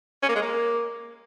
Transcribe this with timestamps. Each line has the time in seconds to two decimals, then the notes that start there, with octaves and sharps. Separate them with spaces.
0.22 C#4
0.29 A#3
0.35 G#3
0.42 A#3